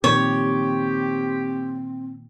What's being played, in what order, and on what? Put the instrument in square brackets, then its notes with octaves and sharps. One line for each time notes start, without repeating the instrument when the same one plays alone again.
[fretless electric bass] A#2 D#3 F3 [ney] C4 [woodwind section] G4 [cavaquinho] C#5